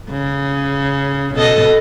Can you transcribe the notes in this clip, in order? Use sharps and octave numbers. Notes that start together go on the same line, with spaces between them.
C#3
B2 A4 D#5